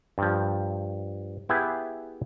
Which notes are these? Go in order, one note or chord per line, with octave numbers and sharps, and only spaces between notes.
G2 F3
B3 E4 G4 G#4 B4